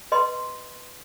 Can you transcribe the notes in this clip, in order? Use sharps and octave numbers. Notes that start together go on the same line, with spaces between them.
B4 D#5 C6